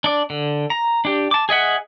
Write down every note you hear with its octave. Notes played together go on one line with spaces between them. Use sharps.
D4 D5
D3
A#5
D4 G4
A5 D6
G#4 D#5 E5 F#5